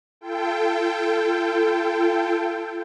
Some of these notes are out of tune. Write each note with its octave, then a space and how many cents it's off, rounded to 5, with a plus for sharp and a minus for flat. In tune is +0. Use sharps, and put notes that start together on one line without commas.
F4 -35 A4 +0 G5 +5